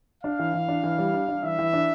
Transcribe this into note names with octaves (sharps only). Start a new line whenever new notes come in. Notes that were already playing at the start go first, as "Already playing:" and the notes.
D4 F5
E3
E3
D4
E3
G3
D4
D4
E3 E5
E3
D4